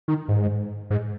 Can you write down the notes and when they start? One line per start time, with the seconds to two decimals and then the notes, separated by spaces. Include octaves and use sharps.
0.08 D#3
0.28 G#2
0.90 G#2